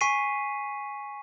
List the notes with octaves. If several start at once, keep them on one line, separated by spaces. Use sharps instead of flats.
G#5 C#6 B6 C7 D#7